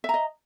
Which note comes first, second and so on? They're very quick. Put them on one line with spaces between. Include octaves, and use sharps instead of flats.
E5 A#5 D#5